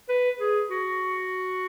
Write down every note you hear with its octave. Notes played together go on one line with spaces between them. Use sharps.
B4
G#4
F#4